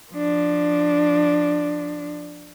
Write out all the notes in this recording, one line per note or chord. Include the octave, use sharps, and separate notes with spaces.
F3 D4